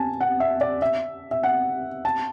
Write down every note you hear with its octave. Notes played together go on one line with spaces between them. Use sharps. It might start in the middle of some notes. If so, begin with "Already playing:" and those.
Already playing: G#5 A5
F#5
E5
D5
E5
E5
F#5
A5